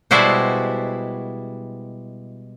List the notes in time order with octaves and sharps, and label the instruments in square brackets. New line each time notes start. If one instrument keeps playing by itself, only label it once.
[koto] B2 G3 G#3 E4 F#4 C5